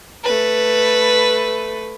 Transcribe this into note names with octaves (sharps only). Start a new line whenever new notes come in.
A3 B4